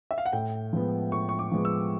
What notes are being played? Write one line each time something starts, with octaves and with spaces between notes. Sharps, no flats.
E5
F5
F#5
A2 G5
F3 G#3 B3
A2 C#6
C#6
D6
F3 G#3 B3
E6